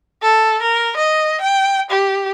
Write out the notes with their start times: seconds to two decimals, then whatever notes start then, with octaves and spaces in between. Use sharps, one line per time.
0.22 A4
0.62 A#4
0.97 D#5
1.41 G5
1.91 G4